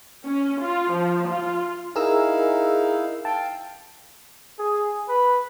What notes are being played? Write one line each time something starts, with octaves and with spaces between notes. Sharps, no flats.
C#4
F4
F3
F4
D#4 E4 G#4 A#4 F5 E6
F5 G5 A5
G#4
B4